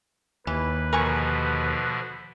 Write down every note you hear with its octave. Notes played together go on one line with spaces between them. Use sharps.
D#2 E3 B4
B2 D3 F3 A#4 G#5 C#6